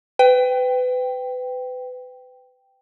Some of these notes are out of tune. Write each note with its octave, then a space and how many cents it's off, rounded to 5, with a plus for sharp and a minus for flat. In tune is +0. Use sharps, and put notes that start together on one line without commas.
B4 +30 G5 +0